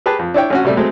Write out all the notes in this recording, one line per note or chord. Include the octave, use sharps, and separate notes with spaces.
G4 G#4 B4 A5
F2
D4 E4 C#5 G5
A1 C#4 F#4
C3 G3 A3
F#3 G#3 A3 C4